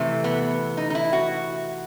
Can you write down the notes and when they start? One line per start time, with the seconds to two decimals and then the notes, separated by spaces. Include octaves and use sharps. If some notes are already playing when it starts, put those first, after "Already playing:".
Already playing: C3 E3 A3
0.24 B3
0.77 D#4
0.90 D#4
0.95 E4
1.13 F#4